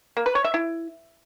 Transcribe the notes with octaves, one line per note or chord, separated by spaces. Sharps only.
A#3
B4
C#5
E5
E4